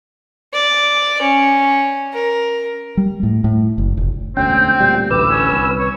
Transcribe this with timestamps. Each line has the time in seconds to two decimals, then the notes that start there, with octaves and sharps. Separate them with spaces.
0.53 D5
1.22 C#4
2.13 A#4
2.97 G3
3.23 A2
3.44 A2
3.78 F#1
3.97 F1
4.37 E1 D2 C4 C#4 G5
4.80 D2 A#2 G3
5.11 A1 D2 B4 D6 E6
5.30 C#4
5.52 C2
5.79 C#5